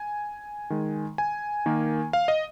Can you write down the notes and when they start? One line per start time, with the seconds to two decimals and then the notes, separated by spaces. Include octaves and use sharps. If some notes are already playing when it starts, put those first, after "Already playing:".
Already playing: G#5
0.70 D#3 G#3
1.18 G#5
1.66 D#3 A#3
2.13 F5
2.28 D#5